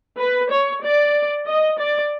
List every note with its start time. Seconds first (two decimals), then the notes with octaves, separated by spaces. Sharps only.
0.19 B4
0.51 C#5
0.82 D5
1.47 D#5
1.78 D5